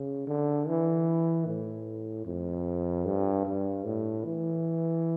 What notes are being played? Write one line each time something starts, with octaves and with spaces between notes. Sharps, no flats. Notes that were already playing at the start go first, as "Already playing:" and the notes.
Already playing: C#3
D3
E3
A2
F2
G2
G2
A2
E3